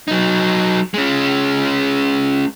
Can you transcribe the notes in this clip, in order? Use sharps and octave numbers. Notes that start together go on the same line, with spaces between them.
F#3 D#4
G#3 C#4